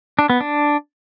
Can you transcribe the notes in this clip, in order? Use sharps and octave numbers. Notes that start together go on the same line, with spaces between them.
D4
B3
D4